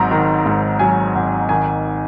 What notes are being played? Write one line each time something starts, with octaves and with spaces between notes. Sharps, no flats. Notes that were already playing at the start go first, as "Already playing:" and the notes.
Already playing: G#1 G#2 F#3 A#5
D#3
G#2
F#3 G#5
G#1
D#3 G#5